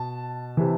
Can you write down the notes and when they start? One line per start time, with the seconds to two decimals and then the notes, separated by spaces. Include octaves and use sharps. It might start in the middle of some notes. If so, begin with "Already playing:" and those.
Already playing: B2 A5
0.57 C3 E3